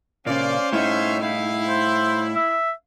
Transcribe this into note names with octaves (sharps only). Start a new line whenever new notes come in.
A#2 C#3 C#4 C5 D5 F5
A2 D#4 C#5 E5 F5
E4 F5
C5
E5